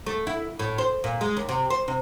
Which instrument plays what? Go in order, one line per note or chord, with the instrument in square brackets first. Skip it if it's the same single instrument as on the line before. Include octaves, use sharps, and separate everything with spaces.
[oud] A3
E4
A2
C5
A#2
G#3
D#2
C3
C5
C3